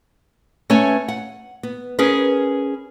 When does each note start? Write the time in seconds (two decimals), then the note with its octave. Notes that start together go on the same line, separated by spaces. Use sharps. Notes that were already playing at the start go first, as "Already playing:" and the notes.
0.70 A3 C#4 B4 C#5 G#5
1.08 F#5
1.63 B3
1.99 C#4 G#4 A#4 B4